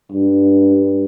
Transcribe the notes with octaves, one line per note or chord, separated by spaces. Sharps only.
G2